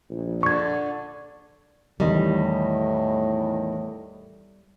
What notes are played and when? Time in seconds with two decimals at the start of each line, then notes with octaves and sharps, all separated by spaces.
0.10 A#1
0.43 D3 C#6 G#6
2.00 E2 A2 D#3 G3 D#5